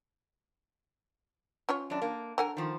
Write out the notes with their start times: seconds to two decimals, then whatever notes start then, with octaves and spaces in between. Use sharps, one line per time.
1.69 C#4 F4 C#5
1.90 F#2 D4
2.02 A#3
2.38 D3 A#4 F#5 G#5
2.57 D#3 F3